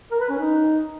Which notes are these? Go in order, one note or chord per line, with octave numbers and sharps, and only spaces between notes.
A#4
B4
C#4
D#4